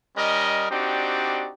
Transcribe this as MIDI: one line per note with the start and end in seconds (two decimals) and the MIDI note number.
0.17 0.66 55
0.17 0.66 61
0.17 0.66 70
0.17 0.66 75
0.71 1.51 60
0.71 1.51 62
0.71 1.51 63
0.71 1.51 66
0.71 1.51 67
0.71 1.51 74